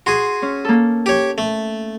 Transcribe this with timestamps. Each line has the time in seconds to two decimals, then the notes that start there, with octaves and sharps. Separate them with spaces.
0.06 F#4 G#4 C6
0.42 C#4
0.65 A#3 A4
1.06 G4 C#5
1.38 A3